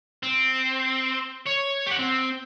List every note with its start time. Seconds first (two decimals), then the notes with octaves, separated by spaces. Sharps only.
0.23 C4
1.47 C#5
1.87 G4 F#5
1.99 C4